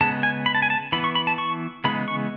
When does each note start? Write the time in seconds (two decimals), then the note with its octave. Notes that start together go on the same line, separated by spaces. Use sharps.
0.01 C#3 G#3 B3 A5
0.23 G#5
0.46 B5
0.55 A5
0.62 G#5
0.70 A5
0.92 E3 B3 B5
1.04 C#6
1.15 B5
1.27 A5
1.38 C#6
1.84 C#3 E3 G#3 B3 B5
2.08 C#6